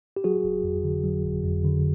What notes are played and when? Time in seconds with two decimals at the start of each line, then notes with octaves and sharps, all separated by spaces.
0.16 G4
0.24 F#3 F#4 G#4
0.44 G1
0.64 F2
0.84 D3
1.04 F#3
1.25 G1
1.44 F2
1.64 D3